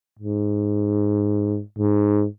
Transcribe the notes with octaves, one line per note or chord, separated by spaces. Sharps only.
G#2
G#2